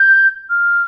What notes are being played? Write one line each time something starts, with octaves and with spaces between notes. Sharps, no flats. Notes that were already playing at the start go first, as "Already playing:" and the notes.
Already playing: G6
F6